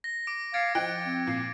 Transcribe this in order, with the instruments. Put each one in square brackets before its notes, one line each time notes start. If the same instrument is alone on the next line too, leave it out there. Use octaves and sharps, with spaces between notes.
[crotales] A#6
D6 D7
[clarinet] F5 [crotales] G#6 A6 C#7 [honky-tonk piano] D7
[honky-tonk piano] F3 G5 F#6 [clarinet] D#5 [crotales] A#6 D7
[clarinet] C4
[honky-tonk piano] A#2 C7